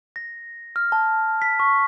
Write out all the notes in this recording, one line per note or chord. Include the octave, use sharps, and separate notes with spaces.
A#6
F6
A5
B6
C#6